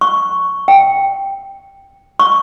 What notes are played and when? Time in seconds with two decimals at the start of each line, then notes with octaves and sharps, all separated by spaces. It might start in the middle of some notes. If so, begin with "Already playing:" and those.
0.01 C#6
0.68 G5
2.19 C#6